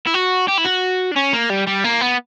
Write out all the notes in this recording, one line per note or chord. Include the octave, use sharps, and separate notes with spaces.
E4
F#4
G4
E4
F#4
D4
C#4
A#3
G3
G3
A#3
B3